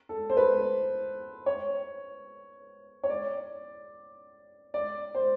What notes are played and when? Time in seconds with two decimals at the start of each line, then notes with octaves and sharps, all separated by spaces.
0.09 A4
0.30 C5
0.37 B4
1.46 C#5
3.04 C#5
3.10 D5
4.74 D5
5.15 C5